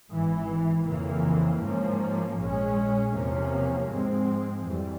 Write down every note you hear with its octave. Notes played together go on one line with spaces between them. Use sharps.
G#1 G#2 E3
F2 C#3 E3 A#3
G#2 F3 A#3 C#4
A#1 A#2 G#3 C#4
E2 C3 F3 A#3 C#4
G#2 F3 G#3 C4
F2 E3 G3